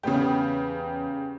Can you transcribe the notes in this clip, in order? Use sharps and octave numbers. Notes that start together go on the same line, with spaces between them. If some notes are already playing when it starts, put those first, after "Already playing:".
E2 C#3 B3 C#4 G4